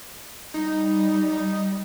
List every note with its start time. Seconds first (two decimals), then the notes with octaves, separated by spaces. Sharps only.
0.54 G3 D#4